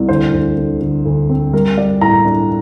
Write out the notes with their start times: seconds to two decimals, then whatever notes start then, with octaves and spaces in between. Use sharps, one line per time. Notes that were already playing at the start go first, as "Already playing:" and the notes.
Already playing: C2
0.09 D2 C5
0.33 D2
0.57 D3
0.82 D3
1.05 D2
1.29 C4
1.53 G3 A#4
1.77 G3 D5
2.01 A2 A#5
2.25 D4